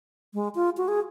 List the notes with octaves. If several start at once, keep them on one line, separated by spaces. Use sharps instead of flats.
G#3
F4
F#4
G#4